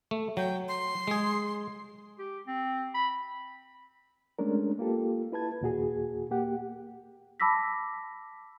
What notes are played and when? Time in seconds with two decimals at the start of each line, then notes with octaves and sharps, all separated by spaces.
0.11 A3
0.37 F#3 G5
0.68 C6
1.08 G#3 G#4
2.19 G4
2.47 C4
2.95 B5
4.39 G#3 A3 C#4 D4 A#4
4.79 A#3 F4 G4 A4
5.32 E4 B4 A5 G#6
5.61 D#2 A#2 F#4 G#4
6.31 A#3 G4 F#5
7.40 A5 B5 D6 E6 A#6 B6